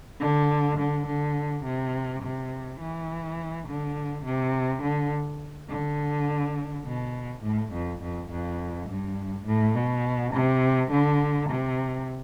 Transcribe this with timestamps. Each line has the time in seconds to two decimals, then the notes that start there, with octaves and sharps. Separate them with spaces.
0.20 D3
0.78 D3
1.07 D3
1.65 C3
2.23 C3
2.81 E3
3.68 D3
4.25 C3
4.83 D3
5.70 D3
6.86 B2
7.43 A2
7.73 F2
8.02 F2
8.31 F2
8.89 G2
9.46 A2
9.75 B2
10.34 C3
10.91 D3
11.49 C3